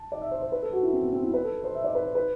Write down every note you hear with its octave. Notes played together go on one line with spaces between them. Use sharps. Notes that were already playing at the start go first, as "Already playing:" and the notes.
Already playing: A5
D5
E5
C5
C5
B4
A4
F#4
E4
C4
B3
C4
E4
B4
A4
C5
E5
D5
B4
C5
B4